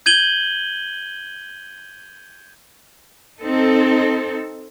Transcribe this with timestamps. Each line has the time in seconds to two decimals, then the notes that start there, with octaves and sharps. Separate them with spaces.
0.06 G6 G#6 D#7 F#7 G7
3.41 C4 D#4 A4